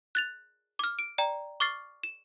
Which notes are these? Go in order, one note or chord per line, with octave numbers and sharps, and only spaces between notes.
F#6 A6 F7
D6 F6
D7
D5 G5 A#5
C#6 D6 F6 A6 C7
E7